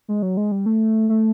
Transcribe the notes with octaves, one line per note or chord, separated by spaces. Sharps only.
G#3
F#3
G#3
G3
A3
A3